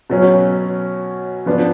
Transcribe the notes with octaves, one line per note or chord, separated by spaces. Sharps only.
B2 F#3 C#4
F3 B3 D4